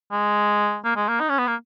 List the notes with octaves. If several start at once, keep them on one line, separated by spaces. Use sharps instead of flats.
G#3
A#3
G#3
A#3
D#4
C#4
B3
A#3